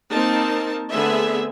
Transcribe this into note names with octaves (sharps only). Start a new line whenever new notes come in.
A#3 C4 D#4 A#4 A5
D3 A3 B3 C4 G#4 E5